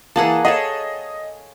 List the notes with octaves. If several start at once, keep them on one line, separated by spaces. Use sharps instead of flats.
E3 A#3 G#4 F#5 A5
G#4 A4 C#5 D#5